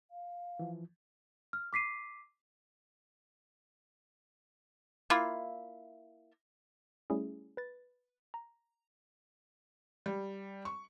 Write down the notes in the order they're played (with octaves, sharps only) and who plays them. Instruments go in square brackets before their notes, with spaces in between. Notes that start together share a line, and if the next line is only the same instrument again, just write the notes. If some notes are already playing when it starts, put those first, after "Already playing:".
[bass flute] F5
[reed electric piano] E3 F3
[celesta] F6
D6 B6 C7 D#7
[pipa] A#3 E4 F4
[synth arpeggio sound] G3 A3 C#4 E4 G#4
B4 A6
A#5
[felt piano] G3
C#6